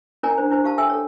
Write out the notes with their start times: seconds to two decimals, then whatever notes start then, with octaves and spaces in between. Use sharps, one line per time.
0.23 C#4 E4 A#4 D5 G#5 A#5
0.38 D4 C5
0.50 D4 E4 C5
0.64 G4 F5 A5
0.78 A4 E5 G5 G#5 E6
0.89 A4 C#5